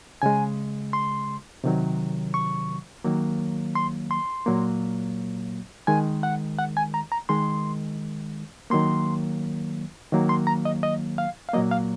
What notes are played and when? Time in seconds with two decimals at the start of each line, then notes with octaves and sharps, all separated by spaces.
0.22 C#3 G#3 G#5
0.93 C6
1.64 C3 D#3 F#3
2.34 C#6
3.04 D#3 F#3 A#3
3.75 C6
4.11 C6
4.46 A#2 F#3 A#3
5.87 D#3 G#3 G#5
6.23 F#5
6.59 F#5
6.77 G#5
6.94 A#5
7.12 A#5
7.29 D#3 G#3 C6
8.70 D#3 F#3 A#3 C6
10.12 D#3 F#3 A#3
10.29 C6
10.47 A#5
10.65 D#5
10.83 D#5
11.18 F5
11.49 F5
11.54 A#2 F#3 A#3 D#5
11.71 F5